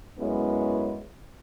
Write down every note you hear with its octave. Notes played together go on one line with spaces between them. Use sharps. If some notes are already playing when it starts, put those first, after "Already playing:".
F#2 G#3 B3 C#4 E4 B4